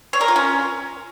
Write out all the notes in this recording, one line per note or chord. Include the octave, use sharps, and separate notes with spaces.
C#5
A#4
F4
C#4